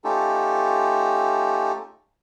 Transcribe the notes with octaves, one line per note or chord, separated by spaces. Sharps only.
A3 C#4 D#4 F4 G4 A4